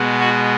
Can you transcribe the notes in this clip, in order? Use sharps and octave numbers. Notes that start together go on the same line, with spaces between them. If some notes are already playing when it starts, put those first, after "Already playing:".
Already playing: B2 G#3 B3
F#4